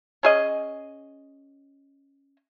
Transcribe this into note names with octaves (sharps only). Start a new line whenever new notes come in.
C#4 G#4 D#5